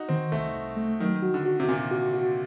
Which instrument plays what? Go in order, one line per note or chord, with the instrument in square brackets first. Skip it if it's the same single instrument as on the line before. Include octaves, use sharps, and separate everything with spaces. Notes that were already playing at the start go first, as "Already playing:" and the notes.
Already playing: [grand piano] D#4 F#4
[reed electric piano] D#3 [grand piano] C4
[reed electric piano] C2 [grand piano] A3
[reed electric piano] C2
A3
[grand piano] D#3 [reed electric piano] F#3
[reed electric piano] F#4
[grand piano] D3
[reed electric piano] F#4
[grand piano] C3
[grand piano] A#2 [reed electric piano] C4
[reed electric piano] F#4
F#4